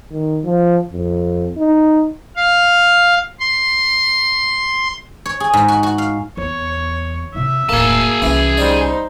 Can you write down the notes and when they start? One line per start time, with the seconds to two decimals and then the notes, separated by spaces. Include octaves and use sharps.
0.11 D#3
0.44 F3
0.92 F2
1.57 D#4
2.36 F5
3.40 C6
5.26 C#5
5.40 G#4
5.53 G#2
5.68 F#4
5.83 F#4
5.98 F5
6.37 E2 C#5
7.34 C3 E4 E5
7.69 D#1 A2 A#3 G#4 A5
8.22 C2 E3 C#4 E4
8.57 G3 D#4 C5 D5